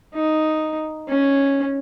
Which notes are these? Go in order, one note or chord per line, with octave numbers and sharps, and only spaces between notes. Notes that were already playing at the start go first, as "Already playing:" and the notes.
D#4
C#4